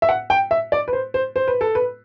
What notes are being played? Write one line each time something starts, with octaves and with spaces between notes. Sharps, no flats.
E5
F#5
G5
E5
D5
B4
C5
C5
C5
B4
A4
B4